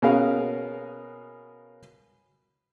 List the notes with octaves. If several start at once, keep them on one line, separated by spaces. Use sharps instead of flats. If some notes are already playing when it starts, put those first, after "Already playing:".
B2 C#4 F#4 G#4 A#4 F5